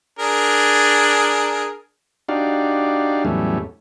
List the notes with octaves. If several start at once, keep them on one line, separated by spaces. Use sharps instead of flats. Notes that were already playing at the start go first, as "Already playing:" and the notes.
D4 G#4 A#4
D4 D#4 F#4 G4 D5 F5
E2 A2 F#3 G3 A3 C#4